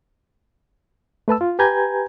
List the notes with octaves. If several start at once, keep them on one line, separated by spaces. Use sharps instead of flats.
A3 B4 A5 E6
F4
G4 B4 G#5 A#5 G6 G#6